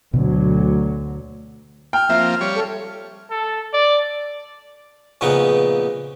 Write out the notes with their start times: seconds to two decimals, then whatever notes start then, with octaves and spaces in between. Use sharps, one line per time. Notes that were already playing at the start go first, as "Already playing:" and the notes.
0.14 D2 B2 D3 F#3
1.93 G5 F6
2.09 F3 A#3 C4 E5
2.41 G3 C#5
2.55 A4
3.30 A4
3.73 D5
5.21 F2 A#2 C#3 B3 D#4